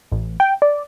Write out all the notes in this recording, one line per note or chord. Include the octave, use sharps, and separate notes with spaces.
A1
G5
D5